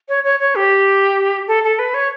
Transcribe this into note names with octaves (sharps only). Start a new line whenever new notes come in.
C#5
C#5
C#5
G4
A4
A4
B4
C#5